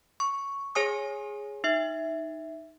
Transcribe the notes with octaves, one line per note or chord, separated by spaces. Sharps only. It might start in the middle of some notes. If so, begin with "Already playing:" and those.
C#6
G#4 C#5 G#5 D#6
D#4 E5